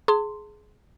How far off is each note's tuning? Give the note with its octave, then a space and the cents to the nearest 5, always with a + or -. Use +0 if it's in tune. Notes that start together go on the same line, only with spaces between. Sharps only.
G#4 +20 A5 +40 C6 +0